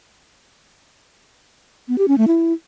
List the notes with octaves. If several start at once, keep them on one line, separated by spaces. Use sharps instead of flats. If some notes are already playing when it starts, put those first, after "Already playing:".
B3
G4
C#4
A3
E4